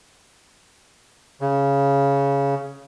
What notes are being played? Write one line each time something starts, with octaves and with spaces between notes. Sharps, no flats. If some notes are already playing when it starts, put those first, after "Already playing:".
C#3